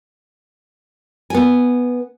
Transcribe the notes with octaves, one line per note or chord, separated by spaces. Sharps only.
B3 G#5